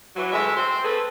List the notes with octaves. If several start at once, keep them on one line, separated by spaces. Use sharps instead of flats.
E3 F#3
D2 G#3 E5
C4 C5
A3 C4 G#4 A4 B4